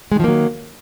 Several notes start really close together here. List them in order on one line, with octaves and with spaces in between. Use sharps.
G#3 D#3 F3 A#3 F#3